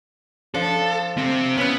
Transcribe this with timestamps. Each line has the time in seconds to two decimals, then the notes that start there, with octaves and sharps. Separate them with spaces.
0.54 F3 D4 A4
1.17 C3 C4
1.58 B3 C#4 E4